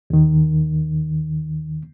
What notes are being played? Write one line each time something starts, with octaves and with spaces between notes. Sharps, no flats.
D#2 D#3